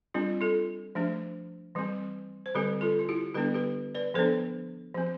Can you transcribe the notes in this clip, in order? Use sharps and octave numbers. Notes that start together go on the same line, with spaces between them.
G3 C4 D4 F4
F4 A4
F3 A3 D4
E3 G3 C4
C5
D3 G3 C4 G4 B4
F4 A4
F4
E4 G4
D3 G3 B3 D4 G4 B4
G4 B4
B4 D5
F3 B3 D4 A4 C5
F3 C4